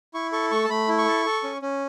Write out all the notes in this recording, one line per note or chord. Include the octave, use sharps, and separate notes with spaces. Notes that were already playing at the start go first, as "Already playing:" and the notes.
E4 C#6
A4 C#6
A3 C#6
A5
A3 B5
E4
C#6
A4
A4
C#4
C#4